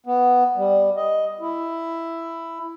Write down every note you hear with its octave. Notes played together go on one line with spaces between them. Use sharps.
B3
G3
D#5
E4